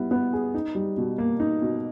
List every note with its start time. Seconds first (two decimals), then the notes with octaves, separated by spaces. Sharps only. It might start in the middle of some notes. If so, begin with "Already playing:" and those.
Already playing: G3 B3 E4
0.11 B3
0.33 G#4
0.54 D#4
0.75 G3
0.97 B2
1.18 A#3
1.40 D#4
1.62 B2